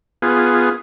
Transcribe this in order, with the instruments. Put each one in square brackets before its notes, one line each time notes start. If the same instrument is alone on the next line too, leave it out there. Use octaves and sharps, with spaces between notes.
[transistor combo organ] B3 F4 G#4